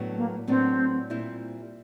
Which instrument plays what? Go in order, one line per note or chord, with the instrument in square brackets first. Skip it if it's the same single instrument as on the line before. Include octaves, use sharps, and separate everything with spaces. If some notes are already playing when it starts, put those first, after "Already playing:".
Already playing: [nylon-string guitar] A2 F#3 B3 D4
[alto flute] A#3
[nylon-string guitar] A2 F#3 B3 D4 [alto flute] C4
[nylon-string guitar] A#2 G3 C4 E4